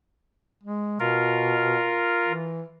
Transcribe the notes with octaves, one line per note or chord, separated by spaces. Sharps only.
G#3
B2 F4 A#4
E3